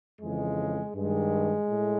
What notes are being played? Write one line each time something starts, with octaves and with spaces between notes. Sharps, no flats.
F2 C#3 E3 G#3
G2 D#3 G#3
A2